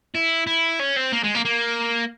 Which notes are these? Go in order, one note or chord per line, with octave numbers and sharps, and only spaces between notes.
E4
E4
C#4
C4
A#3
G#3
A#3
A#3